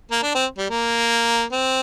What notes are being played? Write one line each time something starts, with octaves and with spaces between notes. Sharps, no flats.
A#3
D4
C4
G3
A#3
C4